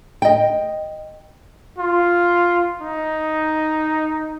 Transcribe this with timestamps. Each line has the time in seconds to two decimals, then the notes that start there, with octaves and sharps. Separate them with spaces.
0.22 D#5 G5
1.78 F4
2.81 D#4